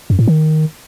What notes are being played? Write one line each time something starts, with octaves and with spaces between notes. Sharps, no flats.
F#2
A2
D#3